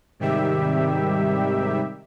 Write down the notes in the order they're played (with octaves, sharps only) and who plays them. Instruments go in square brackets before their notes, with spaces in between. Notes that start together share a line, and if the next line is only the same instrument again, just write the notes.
[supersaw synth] G#2 C3 D#3 G3 G4 E5